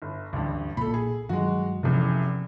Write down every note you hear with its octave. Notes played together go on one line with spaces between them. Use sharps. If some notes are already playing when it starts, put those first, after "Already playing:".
G1
A1 D2 G2 C#3 D4
B1 A#2 A#3 A4 B5
G#4
G2 D#3 F#3 G#3 F#4
F1 E2 C3 F3 C#4